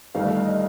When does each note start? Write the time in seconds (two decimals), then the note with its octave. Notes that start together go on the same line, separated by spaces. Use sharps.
0.14 G1 G2 D#3 A3 F5
0.45 D#5